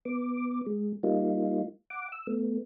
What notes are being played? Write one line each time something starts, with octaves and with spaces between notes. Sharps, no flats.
B3 D6
G#3
G3 A#3 D#4 F4
F#5 D6
E6
A3 B3